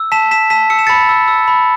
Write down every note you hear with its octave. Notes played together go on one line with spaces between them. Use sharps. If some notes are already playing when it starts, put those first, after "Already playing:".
Already playing: E6
A5 B6 E7
A5 B6 E7
A5 B6 E7
E6 C#7
E7
B5 A6 C#7
E6
E6
B5